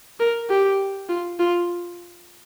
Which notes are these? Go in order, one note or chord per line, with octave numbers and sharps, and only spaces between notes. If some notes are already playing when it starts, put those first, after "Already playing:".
A#4
G4
F4
F4